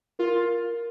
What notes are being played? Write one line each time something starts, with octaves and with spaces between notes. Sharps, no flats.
F4 A#4